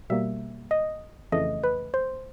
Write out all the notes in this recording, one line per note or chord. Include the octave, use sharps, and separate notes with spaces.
B2 G3 A#3 E5
D#5
F2 C#3 E3 A3 D#5
B4
C5